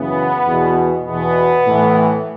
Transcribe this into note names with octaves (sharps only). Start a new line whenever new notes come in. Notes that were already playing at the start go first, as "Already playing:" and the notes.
Already playing: F#2 C#3 E3 B3
E2 B2
E2 B2 B3
A2 E3